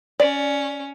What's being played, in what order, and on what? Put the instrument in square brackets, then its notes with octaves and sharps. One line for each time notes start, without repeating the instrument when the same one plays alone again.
[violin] C#4 [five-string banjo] D5